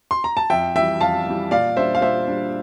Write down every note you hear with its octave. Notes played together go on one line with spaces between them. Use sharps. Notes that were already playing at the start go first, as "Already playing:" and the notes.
C6
A#5
A5
F2 E5 G5
E3 G3 E5 G5
F2 F5 A5
E3 G3
A#2 D5 F5
G3 D4 C5 E5
F5
A#2 C5 E5
G3 D4